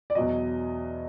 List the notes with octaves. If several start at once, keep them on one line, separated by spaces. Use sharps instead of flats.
D5
E2 B2 F#3 D#5